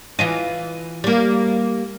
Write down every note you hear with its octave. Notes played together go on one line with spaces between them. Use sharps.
E3 F4 D#5
G3 A#3